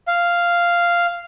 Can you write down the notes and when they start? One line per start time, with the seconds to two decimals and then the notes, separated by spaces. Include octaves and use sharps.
0.08 F5